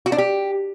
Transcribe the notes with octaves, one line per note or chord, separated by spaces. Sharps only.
F#4
D4
G4